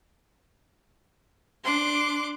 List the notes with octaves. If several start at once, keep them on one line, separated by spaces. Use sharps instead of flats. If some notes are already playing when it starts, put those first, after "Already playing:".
D4 C6 D6 F#6